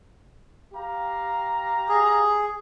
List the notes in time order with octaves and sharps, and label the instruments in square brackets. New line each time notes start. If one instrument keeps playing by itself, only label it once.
[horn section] G4 F5 A#5
[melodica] G#4